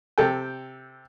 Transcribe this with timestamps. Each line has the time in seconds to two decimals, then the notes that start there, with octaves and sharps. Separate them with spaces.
0.18 C3 A4 G5